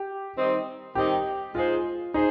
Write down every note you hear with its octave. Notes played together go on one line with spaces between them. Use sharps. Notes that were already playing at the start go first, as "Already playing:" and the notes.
Already playing: G4
D#3 G3 C4 D#4
D#3 G3 C4 D#4 G4
G#3 D#4 F4 G#4 C5
D#4 G#4 C5